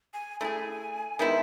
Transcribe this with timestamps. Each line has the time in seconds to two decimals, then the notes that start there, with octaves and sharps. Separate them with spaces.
0.14 G#5
0.40 A3 E4 G#4 G#5
1.19 D#3 G#3 B3 E4 E5